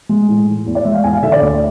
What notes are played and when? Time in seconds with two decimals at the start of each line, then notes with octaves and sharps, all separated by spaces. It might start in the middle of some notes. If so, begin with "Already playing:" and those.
0.09 G#3
0.29 A2
0.47 E3
0.66 E2
0.75 D5
0.85 G#3 E5
0.94 F5
1.04 E2 G#5
1.13 F5
1.23 D3 E5
1.32 D5
1.42 D2